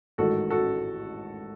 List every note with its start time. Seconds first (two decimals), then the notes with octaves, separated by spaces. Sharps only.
0.18 A1 G#2 D#3 F#4 A4
0.50 F#4 A4